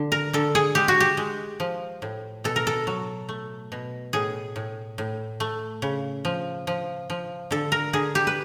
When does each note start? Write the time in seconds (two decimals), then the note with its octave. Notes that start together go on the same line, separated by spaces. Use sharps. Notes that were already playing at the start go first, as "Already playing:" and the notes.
Already playing: D3
0.12 A#4
0.33 D3 A4
0.55 G#4
0.75 G#3 G4
0.88 F#4
1.00 G4
1.17 G#3
1.60 F3
2.02 A2
2.44 B2 A4
2.56 A#4
2.67 A4
2.87 F#3
3.29 A3
3.72 B2
4.13 A2 G#4
4.56 A2
4.98 A2
5.40 A3
5.82 C#3
6.25 F3
6.67 F3
7.10 F3
7.51 D3 A4
7.72 A#4
7.93 D3 G#4
8.15 G4
8.27 B4